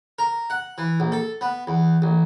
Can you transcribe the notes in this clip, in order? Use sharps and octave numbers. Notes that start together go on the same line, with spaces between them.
A#4
F#5
E3
A#1
A4
B3
E2
A1